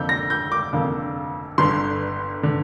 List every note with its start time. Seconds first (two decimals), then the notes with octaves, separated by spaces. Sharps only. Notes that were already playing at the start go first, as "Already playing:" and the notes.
Already playing: F2 D3 A#3 G6
0.09 A#6
0.30 G6
0.52 D6
0.73 F2 D3 A#3
1.58 G1 G2 D3 C6
2.43 D3